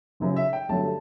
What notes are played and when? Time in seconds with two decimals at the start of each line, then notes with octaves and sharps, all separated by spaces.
0.20 F#1 F#2 C#3 F#3
0.36 E5
0.53 G5
0.69 G1 G2 F#3 A3 A5